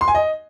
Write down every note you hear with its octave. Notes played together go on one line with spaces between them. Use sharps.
C6
G#5
D#5